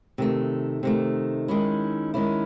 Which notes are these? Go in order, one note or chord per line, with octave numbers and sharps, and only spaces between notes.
C3 D#3 A3
C3 D#3 A3
D#3 G#3 C#4 E4
D#3 G#3 C#4 E4